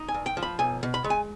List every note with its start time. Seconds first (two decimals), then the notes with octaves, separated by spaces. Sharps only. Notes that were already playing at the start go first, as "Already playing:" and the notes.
Already playing: D#4
0.09 G#5
0.14 G2
0.26 G5
0.37 F3
0.43 B5
0.59 B1 G#5
0.83 B2
0.94 B5
1.04 G#3
1.10 G#5